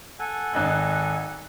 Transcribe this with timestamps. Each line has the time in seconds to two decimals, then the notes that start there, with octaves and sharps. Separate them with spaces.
0.19 A4 F#5 G#5
0.53 G#1 D#5 F#6